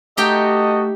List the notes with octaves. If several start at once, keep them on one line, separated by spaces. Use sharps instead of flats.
A3 D#4 F#4 G4 A4 D#5 G5